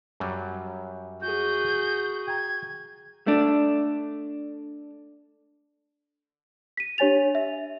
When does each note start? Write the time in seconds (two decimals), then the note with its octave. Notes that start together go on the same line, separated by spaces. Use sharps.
0.20 F#2 F#3 G3
1.22 F#4 G#4 G6
2.27 G5 A#5 G#6
3.27 A3 D4
6.77 B6 D#7
6.98 D4 G4 C#5 G#5 A6 F7
7.35 E5